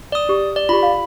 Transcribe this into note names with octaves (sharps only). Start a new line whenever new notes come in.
D5 D#6
G4
D5
F4 G4 B5
F5